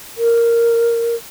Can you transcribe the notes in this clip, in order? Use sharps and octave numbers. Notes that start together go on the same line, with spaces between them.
A#4